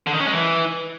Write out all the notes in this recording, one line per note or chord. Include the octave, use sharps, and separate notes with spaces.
D3
D#3
C#4
G#3
E3